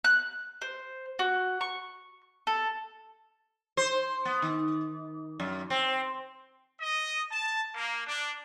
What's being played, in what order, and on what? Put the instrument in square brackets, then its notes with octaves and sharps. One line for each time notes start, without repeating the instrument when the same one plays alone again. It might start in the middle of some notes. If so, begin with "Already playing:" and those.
[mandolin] F#6
C5
F#4
C#6
A4
[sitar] C5
B3
D#3
F#2
C4
[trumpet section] D#5
A5
A#3
D4